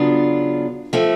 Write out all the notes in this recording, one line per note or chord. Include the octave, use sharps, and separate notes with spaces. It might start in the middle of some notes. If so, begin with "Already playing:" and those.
Already playing: C#3 F#3 B3 D4 F4
F3 A3 C4